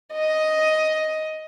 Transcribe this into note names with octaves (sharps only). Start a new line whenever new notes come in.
D#5